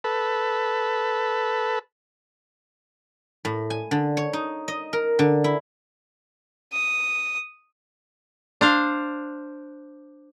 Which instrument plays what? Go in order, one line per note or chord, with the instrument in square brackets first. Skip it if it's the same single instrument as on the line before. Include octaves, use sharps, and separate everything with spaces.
[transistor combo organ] A4 B4
[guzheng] A2
G#5
D3
C#5
D#4
D#5
A#4
D3
E4
[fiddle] D#6
[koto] D4 C5 F5